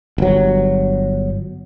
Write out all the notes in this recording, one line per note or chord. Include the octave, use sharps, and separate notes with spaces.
G1 F#3